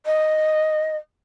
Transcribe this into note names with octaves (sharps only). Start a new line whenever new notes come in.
D#5